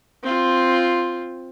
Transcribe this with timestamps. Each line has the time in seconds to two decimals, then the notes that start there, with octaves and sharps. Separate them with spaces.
0.23 C4 F4